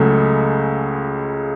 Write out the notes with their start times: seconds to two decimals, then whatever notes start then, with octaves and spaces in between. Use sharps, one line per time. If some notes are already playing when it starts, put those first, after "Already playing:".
Already playing: C#2 C#3 F#3 A3